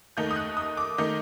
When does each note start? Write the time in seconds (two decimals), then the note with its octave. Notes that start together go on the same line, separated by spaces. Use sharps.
0.17 D#2 D#3 A3 D#4 G6
0.31 D#6
0.36 F#6
0.57 D#6
0.77 D6
0.98 D#3 A3 D#4